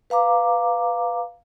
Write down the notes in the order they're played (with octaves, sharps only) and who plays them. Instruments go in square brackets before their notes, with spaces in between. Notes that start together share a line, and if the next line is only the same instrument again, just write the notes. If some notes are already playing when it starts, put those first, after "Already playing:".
[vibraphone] B4 F5 A#5 D6